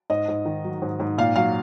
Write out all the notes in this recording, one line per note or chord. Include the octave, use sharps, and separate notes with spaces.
G#2 D#5
G#2
D#3
F#3
G#2
G#2
A#2 F5
F#3 F5